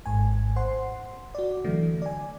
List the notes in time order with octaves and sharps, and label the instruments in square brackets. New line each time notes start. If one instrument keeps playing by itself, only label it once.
[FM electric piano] G#1 G#2 G#5
C5 F#5 C6
F#4 D5
D3 E3 F#3 A3
D5 G#5